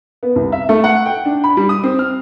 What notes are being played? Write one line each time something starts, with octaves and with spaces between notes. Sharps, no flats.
B3
C2
E5
A3
F#5
G5
D4
B5
G3
D#6
C4
F6